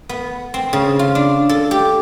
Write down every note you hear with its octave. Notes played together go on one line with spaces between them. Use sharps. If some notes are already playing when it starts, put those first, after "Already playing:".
B3
C4
C#3
F4
D4
A4
G4